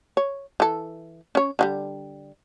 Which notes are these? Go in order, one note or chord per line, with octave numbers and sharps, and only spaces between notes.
C#5
E3 A4
C#4 C#5
D3 F#3 G3